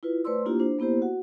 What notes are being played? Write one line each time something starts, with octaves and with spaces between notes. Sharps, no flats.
E4 F4 B4
A3 B4 C5 D5 C6 E6
A#3 D4 E4 F4 G4
D4 C5
A#3 B3 E4 G4 C5
F#4 F#5